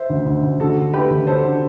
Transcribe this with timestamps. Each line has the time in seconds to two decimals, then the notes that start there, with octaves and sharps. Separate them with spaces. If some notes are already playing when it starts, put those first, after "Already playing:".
Already playing: C5 E5
0.10 D2
0.26 D2
0.43 D2
0.60 D2 F#4 A4
0.77 D3
0.93 A3 G4 B4
1.10 D2
1.27 D3 A4 C5
1.44 D3